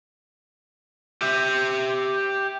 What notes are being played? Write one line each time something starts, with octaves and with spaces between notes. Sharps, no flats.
G4 E5